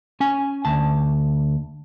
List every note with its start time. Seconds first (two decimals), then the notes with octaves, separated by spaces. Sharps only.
0.20 C#4 G#5
0.65 D2 A5